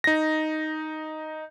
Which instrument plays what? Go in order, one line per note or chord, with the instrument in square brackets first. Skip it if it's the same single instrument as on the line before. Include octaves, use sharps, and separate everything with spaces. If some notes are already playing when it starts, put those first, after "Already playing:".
[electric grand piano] D#4 A#6